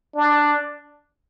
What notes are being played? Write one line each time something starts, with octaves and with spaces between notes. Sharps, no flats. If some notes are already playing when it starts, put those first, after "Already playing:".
D4